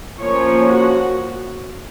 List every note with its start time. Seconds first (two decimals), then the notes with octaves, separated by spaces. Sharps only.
0.20 F3 A#3 C#4 C#5
0.67 F#4